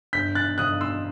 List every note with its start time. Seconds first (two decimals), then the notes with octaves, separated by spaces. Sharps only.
0.13 G1 G6 B6
0.35 F#6 A6
0.58 G1 D#6 F#6
0.81 C6 E6